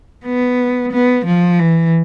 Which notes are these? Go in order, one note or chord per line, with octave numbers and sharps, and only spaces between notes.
B3
B3
F3
E3